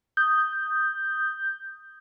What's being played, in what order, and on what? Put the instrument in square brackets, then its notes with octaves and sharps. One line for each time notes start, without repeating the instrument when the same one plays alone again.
[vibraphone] D#6 [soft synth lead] G6